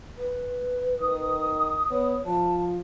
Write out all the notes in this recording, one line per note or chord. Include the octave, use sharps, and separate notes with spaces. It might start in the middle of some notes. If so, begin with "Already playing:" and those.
B4
D#3 D#6
B3 C#5
F3 A5